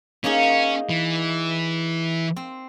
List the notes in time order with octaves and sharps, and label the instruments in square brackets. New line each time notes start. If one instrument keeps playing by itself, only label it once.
[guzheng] A#3 D#4 G#4 [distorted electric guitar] C#4
[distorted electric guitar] E3
[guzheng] C4